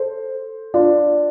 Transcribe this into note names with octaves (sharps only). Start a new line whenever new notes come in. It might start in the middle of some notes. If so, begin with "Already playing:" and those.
Already playing: A4 C5
D4 F4